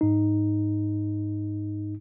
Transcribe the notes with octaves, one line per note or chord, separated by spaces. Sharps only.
G#2 D#4